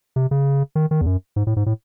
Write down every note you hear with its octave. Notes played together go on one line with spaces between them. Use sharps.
C3
C#3
D#3
D#3
E2
F#2
G#2
A2
G#2
A2